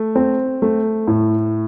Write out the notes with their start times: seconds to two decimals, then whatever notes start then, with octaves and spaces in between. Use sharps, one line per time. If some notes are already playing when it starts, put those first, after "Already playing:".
Already playing: A3
0.16 C4
0.62 A3
1.07 A2